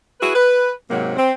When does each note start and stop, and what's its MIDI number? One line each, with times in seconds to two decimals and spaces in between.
0.21 0.34 64
0.21 0.34 66
0.21 0.34 68
0.21 0.34 71
0.35 0.71 71
0.89 1.14 44
0.89 1.14 48
0.89 1.14 54
0.89 1.14 58
1.16 1.31 60